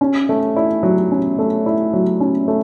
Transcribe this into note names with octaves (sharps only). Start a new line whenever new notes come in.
C#4
A3
E4
F#3
C#4
A3
E4
F#3
C#4
A3